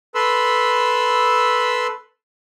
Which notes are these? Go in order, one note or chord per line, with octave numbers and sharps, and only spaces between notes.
A4 B4 B5 C6 E6